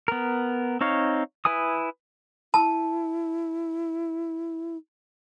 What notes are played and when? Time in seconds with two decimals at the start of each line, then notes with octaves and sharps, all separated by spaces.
0.08 B3 A#4
0.81 C4 D#4 C#5 F5
1.45 E4 B4 G#5 D#6
2.54 E4 A5